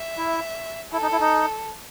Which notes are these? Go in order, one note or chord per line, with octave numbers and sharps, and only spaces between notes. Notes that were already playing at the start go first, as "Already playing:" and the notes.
Already playing: E5
E4
E4 A4
D#4
E4
D#4